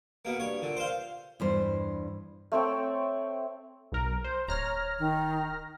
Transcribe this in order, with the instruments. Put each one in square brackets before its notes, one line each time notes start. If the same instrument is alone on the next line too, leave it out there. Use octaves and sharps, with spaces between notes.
[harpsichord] B2 A#3
[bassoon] G2 [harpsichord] C#5
[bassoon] A#2 [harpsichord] D3
[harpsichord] C5 F5
[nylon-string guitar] E2 G2 C5
[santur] A3 C4 C#5 G5
[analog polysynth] B1 A#4
C5
[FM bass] D1 [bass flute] C#5 [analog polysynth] A#5 F6 A#6
[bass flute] D#3